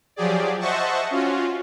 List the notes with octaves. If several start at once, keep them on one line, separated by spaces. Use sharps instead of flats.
F3 F#3 G4 G#4 D5
C5 D#5 E5 F#5 A5 C#6
C#4 F4 F#4